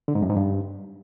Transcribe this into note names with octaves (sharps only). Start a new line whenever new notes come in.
D3
G#2
F#2
G#2
G2